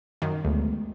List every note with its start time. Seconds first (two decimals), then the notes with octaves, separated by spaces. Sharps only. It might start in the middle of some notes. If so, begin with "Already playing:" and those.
0.22 F#2 D#3
0.45 D2 G#3 A3 B3